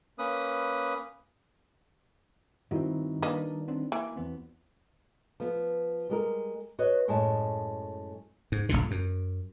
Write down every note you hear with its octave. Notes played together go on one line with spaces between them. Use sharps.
A#3 C#4 B4 D#6
G2 D#3 G3 C4 D#4 E4 F#4
A#3 D4 A#4 B4 D#5
B3 C4 D4
E3 A#3
E2 B3 C4
F3 B3
G3 G#3 A#4
F#4 B4 C#5 D#5
F#2 A2 G#3 C#5 D#5 A5
G#2
F#1 B1 A#2 D3
F#2